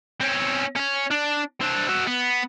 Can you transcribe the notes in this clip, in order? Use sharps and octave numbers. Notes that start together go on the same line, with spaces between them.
C4 C#4
C#4 C#5
D4
C4 D4
F#4 E5
B3